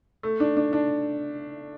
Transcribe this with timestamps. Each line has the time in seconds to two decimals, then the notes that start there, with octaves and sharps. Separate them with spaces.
0.23 A3
0.40 D4
0.57 D4
0.73 D4